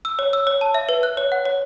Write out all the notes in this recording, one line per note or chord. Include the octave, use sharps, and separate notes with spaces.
E6
C#5
E6
C#5
A5
E5
B4
F#6
C#5
F#5
C#5